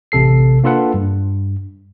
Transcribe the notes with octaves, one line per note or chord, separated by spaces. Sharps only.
A1 C3 A4 C7
A#3 D4 F4 A4 B4 F#5
G2